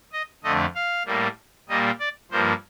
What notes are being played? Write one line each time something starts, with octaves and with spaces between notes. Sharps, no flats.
D#5
F2 D3 A3 D#5
F5
A2 G3 A#3
A#2 G3 A#3 D#5
D5
G2 F3 A#3 C5